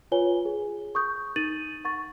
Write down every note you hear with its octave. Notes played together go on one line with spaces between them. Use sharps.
F4 B4 C#5 G#5 G7
G#4
C#6 D#6 G6
D#4 A6 D#7 F#7
F#5 C#6 A6